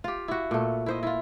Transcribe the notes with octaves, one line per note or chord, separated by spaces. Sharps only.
F4 G4
E4 F#4
A#2 A3
E4 C5 D#5
E4 F4